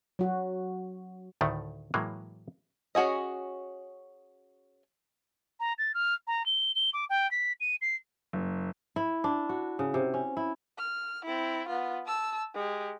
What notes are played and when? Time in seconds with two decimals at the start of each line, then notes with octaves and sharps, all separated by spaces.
0.19 F#3 F#4
1.41 D2 A2 D#3 A3
1.94 A2 E3 F#3 G#3 A#3
2.95 C#4 F#4 G#4 D#5
5.60 A#5
5.78 A6
5.94 F6
6.27 A#5
6.46 G7
6.75 G7
6.93 D6
7.10 G5
7.31 B6
7.61 D#7
7.81 C7
8.33 F#1
8.96 E4
9.24 D4
9.49 F#4
9.79 C#3
9.94 C3
10.14 C#4
10.37 E4
10.78 F6
11.25 C4 E4
11.68 B3 F4
12.06 A5 E6
12.55 G#3 G4